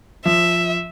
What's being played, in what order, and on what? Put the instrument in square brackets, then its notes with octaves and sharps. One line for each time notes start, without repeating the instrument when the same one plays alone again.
[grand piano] F3 [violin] E5